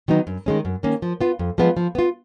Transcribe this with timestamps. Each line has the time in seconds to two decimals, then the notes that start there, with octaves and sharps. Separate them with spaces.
0.08 D#3 F#3 B3 D#4
0.27 F#2
0.46 D#3 G#3 C#4
0.65 F#2
0.83 D#3 A#3 C#4
1.02 F3
1.21 B3 F4
1.39 F2
1.58 F3 G#3 B3 F4
1.77 F3
1.95 B3 F4